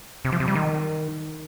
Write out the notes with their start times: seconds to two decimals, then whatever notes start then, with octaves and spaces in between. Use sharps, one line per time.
0.25 C3
0.32 F3
0.40 C3
0.48 G3
0.55 D#3